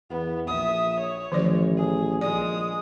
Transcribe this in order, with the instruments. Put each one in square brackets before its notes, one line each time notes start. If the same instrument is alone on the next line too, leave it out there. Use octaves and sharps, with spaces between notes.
[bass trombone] E2 [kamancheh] B3
[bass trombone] A#1 [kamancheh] E5 D#6
[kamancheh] C#5
[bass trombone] A1 [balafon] D#3 F3 D5
[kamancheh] G#4
[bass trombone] A#1 [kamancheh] G#3 D#6 [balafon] D5